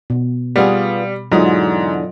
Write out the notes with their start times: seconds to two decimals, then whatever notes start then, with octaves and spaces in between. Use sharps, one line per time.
0.10 B2
0.56 G3 B3 F4 G#4
1.32 E2 G#2 D3 F#3 F4 D#5